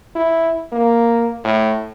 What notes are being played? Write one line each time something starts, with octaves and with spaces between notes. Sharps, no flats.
E4
A#3
A2